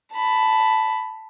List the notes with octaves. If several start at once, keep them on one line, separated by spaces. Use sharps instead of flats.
A5 B5